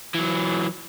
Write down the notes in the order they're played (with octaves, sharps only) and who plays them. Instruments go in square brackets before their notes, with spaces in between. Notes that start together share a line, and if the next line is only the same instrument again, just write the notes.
[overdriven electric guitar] E3 F#3